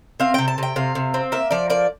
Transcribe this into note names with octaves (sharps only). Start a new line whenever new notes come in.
C4 F5
C3 G5
A5
C3 G5
C3 F5
C3
C4
A#3 E5
F3 D5
A#3 D5